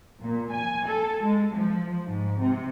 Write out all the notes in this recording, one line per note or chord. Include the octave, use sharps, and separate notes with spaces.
A#2
G#5
A4
G#3
F3
G#2
C3